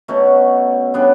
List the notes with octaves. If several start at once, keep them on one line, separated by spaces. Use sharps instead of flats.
B2 F#3 A3 C#4
C#3 G3 B3 D4